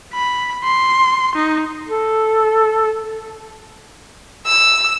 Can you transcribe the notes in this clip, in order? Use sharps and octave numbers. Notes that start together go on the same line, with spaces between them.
B5
C6
D#4
A4
E6